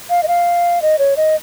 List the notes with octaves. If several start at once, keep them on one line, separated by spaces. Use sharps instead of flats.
F5
D#5
F5
D#5
C#5
D#5